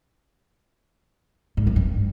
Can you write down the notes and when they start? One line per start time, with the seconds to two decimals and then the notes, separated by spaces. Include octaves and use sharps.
1.57 G#2
1.67 E3
1.76 G2